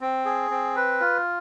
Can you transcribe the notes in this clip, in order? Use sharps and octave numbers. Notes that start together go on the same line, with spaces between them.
C4
G#4
C4
B4
F4